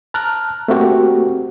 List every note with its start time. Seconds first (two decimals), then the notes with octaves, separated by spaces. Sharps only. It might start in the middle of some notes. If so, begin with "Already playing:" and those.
0.14 A5 A#5 F6 F#6
0.68 A3 A#3 C4 F#4 G4 A#4